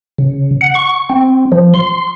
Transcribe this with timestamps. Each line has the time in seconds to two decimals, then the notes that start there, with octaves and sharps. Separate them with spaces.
0.18 C#3
0.61 F#5
0.75 C#6
1.10 C4
1.52 F3
1.74 C6